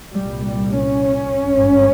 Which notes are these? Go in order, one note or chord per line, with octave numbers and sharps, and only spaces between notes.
C2 A#2 G3
G3
C#4
G#1 G2